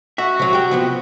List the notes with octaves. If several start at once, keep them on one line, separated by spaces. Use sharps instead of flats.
F#4 E5
C3 F#3
G4 G5
C3 F3 B3